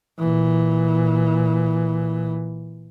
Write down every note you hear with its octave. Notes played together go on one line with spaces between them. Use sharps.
A#2 E3